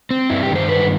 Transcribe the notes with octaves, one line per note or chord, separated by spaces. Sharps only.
C4
G2 E4
G4
D#3
C5
G2 B4